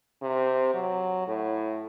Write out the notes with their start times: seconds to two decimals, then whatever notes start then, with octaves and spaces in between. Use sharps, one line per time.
0.22 C3
0.74 F#3
1.28 A2